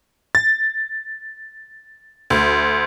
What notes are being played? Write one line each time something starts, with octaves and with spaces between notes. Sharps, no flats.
A6
D2